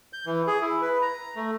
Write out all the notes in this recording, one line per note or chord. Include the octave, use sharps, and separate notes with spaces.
G6
E3
G#4
E4
B4
A#5
A3